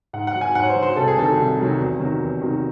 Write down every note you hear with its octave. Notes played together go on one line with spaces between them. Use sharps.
G#2 F#5
F#5
F#3
G#5
G#2 F#5
C#5
C5
F#3
C5
C2 A4
G#4
C3 D#3 F#3 A4
C2
C3 D#3 F#3
E2
C3 D#3 F#3
E2
C3 D#3 F#3